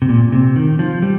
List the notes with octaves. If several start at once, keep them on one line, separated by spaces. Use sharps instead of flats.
C3
A#2
C3
D#3
F3
G3